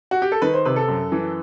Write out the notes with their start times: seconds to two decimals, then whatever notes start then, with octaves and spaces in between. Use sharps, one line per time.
0.11 F#4
0.22 G4
0.32 A4
0.42 D#3 B4
0.54 C5
0.65 C3 B4
0.76 A4
0.88 F#2
1.12 E3